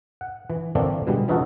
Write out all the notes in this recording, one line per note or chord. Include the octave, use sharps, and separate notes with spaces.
F#5
E3
D3 E3 A3 A#3 C4 D4
B2 D3 G3 G#3
C#3 E3 D#4 F4 F#4 A4